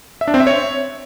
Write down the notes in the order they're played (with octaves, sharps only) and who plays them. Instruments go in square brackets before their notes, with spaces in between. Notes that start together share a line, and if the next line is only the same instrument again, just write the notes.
[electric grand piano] E5
D4
C4
E5
C#5